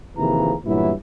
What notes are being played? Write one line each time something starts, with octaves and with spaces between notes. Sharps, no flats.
D#2 C3 E3 F3 G#4 A#5
G2 A#2 E3 F#3 B3 E4